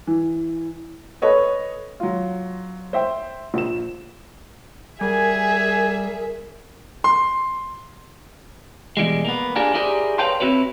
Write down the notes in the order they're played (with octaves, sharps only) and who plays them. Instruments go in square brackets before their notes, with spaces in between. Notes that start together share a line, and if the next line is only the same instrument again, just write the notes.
[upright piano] E3
A4 B4 C#5 D#5
F#3 F4
C5 E5 G5
A#1 E7
[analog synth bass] G3 [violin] G#4 E5 [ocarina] A#4 [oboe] G#5
[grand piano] C6
[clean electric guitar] B2 E3 G3 G#3
A#3 B3
D4 F4 G4 G#4 A#4
E4 G4 G#4 A#4 C5 D5
B4 C#5 F5 G5 A5 C6
C4 C#4 E4 F#4 B4 C#5